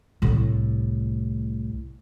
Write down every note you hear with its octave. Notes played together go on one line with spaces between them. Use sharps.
C2 A2